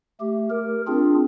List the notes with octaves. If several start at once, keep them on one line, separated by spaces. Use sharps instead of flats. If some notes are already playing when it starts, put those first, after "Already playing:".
A3 G4
A#4
C4 D4 F4 G#4